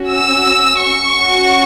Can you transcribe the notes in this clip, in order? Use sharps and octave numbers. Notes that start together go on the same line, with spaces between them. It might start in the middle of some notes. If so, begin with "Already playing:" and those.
Already playing: C#4 F#4
E6
C#6
C#4 F#4